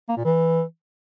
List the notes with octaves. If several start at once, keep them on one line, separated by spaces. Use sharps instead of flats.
A#3
A#2
E3